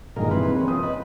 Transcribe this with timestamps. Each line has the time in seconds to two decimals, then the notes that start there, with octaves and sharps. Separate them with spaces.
0.16 G2 A#2 D#3 G#3 G#4 A#4
0.31 C3 E3 B4 C6
0.56 C#4
0.68 F3 C4 D#6
0.83 B4 D#5